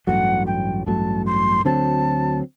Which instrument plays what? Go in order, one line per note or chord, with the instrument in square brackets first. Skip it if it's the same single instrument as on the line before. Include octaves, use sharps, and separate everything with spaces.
[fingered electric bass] A1 G2 F#3 A3 [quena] F#5
[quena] G5
[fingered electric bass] A1 G2 F#3 A3 [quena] A5
[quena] C6
[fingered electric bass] D2 D3 F#3 C4 [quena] A5